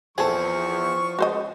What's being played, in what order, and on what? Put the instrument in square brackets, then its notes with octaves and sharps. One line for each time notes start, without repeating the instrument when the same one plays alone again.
[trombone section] E2 [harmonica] F3 C#6 [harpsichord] C4 [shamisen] G#4 A4
[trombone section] C#2 [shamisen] F#4 C5 D#5